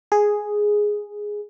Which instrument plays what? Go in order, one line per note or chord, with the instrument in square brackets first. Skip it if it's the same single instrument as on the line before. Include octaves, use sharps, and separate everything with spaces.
[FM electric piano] G#4